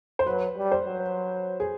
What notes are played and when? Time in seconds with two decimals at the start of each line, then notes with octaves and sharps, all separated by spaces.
0.19 C5
0.26 F#3 B4
0.57 G3
0.72 C5
0.86 F#3
1.60 G#4